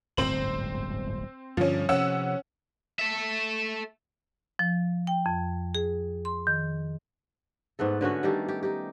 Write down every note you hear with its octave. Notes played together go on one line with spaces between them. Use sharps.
D1 G1 G#2 C4 C5 F#7
G2 D3 F3 G3 C#4
C3 F3 C#4 F#5 E6
A4 E5
F3
G5
F2
G#4
C6
D#3
G#2 A3 B3 A4
D3 B3 C#4 F#4
D#3 G3 G4 A4
G4
D#4 G4